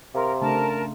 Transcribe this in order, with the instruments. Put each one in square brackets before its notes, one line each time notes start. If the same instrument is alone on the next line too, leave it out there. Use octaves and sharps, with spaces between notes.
[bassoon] C3 [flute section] A#4 [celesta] F5 A#5 C6
[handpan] C#3 A3 D4 [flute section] A#4 A5